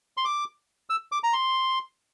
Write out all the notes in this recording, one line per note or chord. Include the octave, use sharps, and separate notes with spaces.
C6
D6
E6
D6
A#5
C6